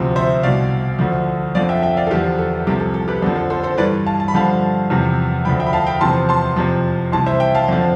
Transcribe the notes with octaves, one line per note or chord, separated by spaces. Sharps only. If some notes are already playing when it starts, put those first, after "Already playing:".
Already playing: D2 C3 F3
C5 E5
C2 B2 D5 F5
D2 D3 F3
F2 D3 F3 D5 F5
E5 G5
E5 G5
D5 F5
A4
E2 D3 F3 G4
A4
C2 C3 F3 G4
A4
A4
G4 B4
F2 D3 F3 A4
A4
A4 C5
A4 C5
G2 E3 B4 D5
F5 A5
A5
B5
G2 D3 F3 F5 A5
E2 C3 F3
D2 D3 F3 G5 B5
E5 G5
B5
F5 A5
G5 B5
E2 C3 F3 A5 C6
A5 C6
F2 C3 F3
C2 C3 E3 A5 C6
C5 E5
E5 G5
F5 A5
F2 D3 F3